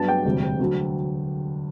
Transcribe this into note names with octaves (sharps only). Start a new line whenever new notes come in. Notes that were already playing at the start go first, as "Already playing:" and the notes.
Already playing: G2 F#3 B3 D4 A5
G5
E1 D2 C3 G3
D2 D3 F#3